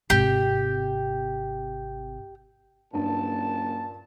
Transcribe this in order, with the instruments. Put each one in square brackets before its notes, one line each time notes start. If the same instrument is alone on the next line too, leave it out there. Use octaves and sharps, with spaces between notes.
[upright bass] G#1 C3 [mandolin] G4
[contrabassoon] F#1 [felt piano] G2 [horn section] A#2 A5